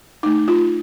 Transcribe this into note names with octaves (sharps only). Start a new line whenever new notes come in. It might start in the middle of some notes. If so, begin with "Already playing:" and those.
D#4
A3
F4